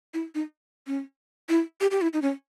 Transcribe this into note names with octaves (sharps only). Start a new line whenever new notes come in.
E4
D#4
C#4
E4
G4
G4
E4
D#4
C#4